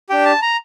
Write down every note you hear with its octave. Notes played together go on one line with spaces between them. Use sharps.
D4 G4 G5
A5
A#5